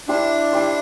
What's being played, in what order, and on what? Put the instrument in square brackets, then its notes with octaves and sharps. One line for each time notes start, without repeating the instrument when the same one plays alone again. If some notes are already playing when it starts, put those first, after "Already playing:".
[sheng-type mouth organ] D4 [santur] E4 G4 C5
[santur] E4 G4 C5